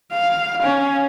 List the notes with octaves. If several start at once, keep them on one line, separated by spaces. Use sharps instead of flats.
F5
C#4